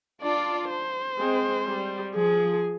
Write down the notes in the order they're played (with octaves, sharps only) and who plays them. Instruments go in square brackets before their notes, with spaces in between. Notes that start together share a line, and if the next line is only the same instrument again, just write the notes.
[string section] D4 F4 [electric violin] D5
[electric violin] C5
[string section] G#3 C4
G3
[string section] F3 [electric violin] G#4